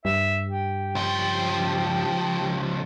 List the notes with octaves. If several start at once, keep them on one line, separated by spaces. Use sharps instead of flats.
G2 E5
G4
C#2 F3